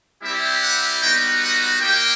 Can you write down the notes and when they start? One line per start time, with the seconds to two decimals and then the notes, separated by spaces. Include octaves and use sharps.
0.23 G3 C4 E4 G4 E5
0.63 F#5
1.02 G3 B3 D#4 F#4 G5
1.42 F#5
1.81 A#3 D#4 G4 G5